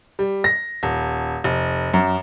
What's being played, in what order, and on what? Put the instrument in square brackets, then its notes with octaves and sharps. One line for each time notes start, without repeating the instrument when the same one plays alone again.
[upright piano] G3
A#6
D#1
F1
F#2